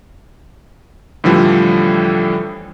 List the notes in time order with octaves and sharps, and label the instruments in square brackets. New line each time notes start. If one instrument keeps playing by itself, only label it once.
[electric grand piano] A2 D3 E3 F3 G3